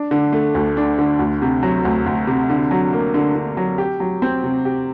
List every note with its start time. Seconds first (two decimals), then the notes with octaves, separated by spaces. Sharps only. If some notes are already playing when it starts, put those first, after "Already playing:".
Already playing: D4
0.11 D3
0.33 A3
0.55 D2
0.77 D4
0.99 D3
1.19 D2
1.42 C3
1.63 F#3
1.85 D2
2.06 D2
2.27 C3
2.50 D3
2.71 F#3
2.93 A#3
3.14 D3
3.36 D3
3.57 F#3
3.78 G4
4.00 F#3
4.22 C4
4.44 C3
4.65 G4